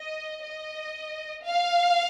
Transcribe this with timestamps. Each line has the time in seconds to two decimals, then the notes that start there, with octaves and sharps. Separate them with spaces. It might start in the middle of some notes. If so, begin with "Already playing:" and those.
Already playing: D#5
0.43 D#5
1.45 F5